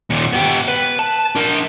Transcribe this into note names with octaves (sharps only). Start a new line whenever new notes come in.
D#2 A#2
B3 G4
B4
A5
D4 A#4